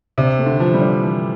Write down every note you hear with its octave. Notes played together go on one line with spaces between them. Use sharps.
C3 D4
A3
D3
E3 F3
G3
D4
E3